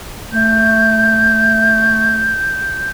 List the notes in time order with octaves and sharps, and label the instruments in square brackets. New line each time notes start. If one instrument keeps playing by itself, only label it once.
[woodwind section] A3 [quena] G6